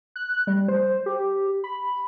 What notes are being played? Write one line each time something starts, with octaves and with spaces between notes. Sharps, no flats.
F#6
G3
C5
G4
B5